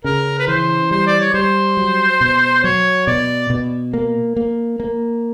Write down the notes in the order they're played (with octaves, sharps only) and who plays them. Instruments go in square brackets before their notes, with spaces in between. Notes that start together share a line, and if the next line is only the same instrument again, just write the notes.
[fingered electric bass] C#3 [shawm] A#4
[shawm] B4
[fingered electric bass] E3 [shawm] C5
[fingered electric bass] G3 [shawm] C5
[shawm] D5
C#5
[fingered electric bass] G3 [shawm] C5
[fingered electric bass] F#3
B2
[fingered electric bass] F#3 [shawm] C#5
[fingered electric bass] B2 [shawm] D5
[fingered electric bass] B2
A#3
A#3
A#3